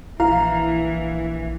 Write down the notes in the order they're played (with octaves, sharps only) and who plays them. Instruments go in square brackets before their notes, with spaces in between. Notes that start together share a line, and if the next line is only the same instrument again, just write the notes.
[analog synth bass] A#1 [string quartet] E3 [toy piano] E4 [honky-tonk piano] F5